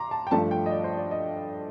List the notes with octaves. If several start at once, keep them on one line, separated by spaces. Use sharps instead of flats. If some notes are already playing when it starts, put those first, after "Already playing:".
Already playing: A#5 C6 D6
A5
G5
G2 F3 A3 A5
G5
D#5
D5
C5
D5
D#5